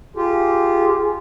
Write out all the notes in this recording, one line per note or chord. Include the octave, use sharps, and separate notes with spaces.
F4 G4 G#4